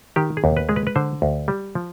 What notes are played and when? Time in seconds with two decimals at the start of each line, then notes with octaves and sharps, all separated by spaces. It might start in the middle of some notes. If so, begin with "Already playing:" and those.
0.16 D#3 G4
0.37 G#4
0.44 D#2
0.57 B4
0.69 G#3 G#4
0.76 B4
0.87 B4
0.96 D3 C5
1.22 D2
1.48 G3
1.75 F3